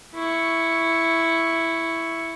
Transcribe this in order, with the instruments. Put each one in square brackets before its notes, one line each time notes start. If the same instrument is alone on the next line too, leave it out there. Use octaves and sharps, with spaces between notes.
[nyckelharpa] E4 C#6